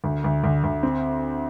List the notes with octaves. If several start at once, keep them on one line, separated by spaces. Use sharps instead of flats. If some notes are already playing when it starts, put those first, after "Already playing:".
D2
D2
D2
D2
C4